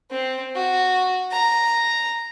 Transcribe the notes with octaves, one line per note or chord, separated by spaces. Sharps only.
C4
F#4
A#5